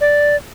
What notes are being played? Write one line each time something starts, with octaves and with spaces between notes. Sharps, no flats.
D5